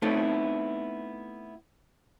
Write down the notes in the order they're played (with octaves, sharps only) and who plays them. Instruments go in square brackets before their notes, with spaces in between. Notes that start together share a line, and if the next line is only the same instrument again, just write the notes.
[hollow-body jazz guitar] A3 B3 C4 D#4 E4 A4